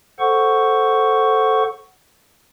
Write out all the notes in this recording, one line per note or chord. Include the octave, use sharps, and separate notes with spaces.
A4 C5 F#5 C#6